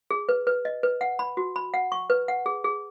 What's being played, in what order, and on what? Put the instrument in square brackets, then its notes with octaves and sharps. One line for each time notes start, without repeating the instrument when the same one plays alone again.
[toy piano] G#4
B4
B4
D#5
B4
F#5
B5
F#4
B5
F#5
C#6
B4
F#5
G#4
G#4